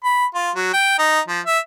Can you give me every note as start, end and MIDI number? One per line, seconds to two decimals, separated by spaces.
0.04 0.25 83
0.35 0.50 65
0.55 0.73 54
0.73 0.98 79
0.99 1.20 63
1.28 1.40 53
1.46 1.59 76